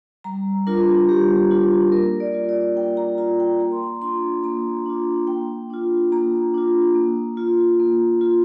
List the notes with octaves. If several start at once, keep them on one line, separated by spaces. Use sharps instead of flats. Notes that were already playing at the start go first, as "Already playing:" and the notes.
G3 A#5
D4 F4 A#4
G3 G4
D4 F4
A#3 A#4
D5
F4
D5
A#3 G5
A#5
F4 A#5
G5
A#3 A#5
C6
A#5
D4 F4 C6
A#3 A#5
D4 F4
A#3 G5
D4 F4
A#3 A#5
D4 F4
A#3
F4
A#3
F4